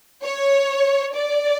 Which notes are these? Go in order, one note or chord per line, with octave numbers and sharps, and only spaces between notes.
C#5
D5